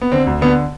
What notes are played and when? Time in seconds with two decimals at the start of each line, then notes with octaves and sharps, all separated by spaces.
0.02 B3
0.12 D3 C4
0.27 D2
0.41 D3 B3